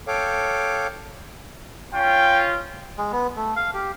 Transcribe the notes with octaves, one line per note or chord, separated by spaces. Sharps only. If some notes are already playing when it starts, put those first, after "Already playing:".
A4 C#5 F5 G5 D6
C#4 F4 G5
G#3
B3
A3
F5
G4